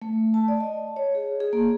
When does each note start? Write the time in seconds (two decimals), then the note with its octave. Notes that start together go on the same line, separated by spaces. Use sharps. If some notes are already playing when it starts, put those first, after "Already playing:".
0.02 A3
0.34 A5
0.48 D5
0.60 D#5
0.96 C#5
1.15 G#4
1.40 G#4
1.53 A#3